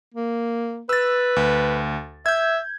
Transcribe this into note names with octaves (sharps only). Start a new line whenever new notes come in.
A#3
B4 E6 A6
D2
E5 G6 G#6